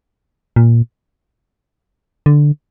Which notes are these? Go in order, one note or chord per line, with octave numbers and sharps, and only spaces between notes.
A#2
D3